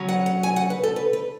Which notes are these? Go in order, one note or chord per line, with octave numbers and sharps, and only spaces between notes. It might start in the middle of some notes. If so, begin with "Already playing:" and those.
Already playing: C#3 F#3 C#4
F#5
F#5
G#5
F#5
B4
A4
B4
B4